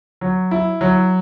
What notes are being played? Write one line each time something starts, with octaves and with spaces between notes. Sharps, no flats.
F#3
E4
F#3